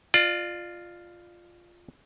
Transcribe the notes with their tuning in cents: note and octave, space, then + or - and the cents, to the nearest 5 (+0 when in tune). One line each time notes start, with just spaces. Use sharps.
F4 +0 D5 +35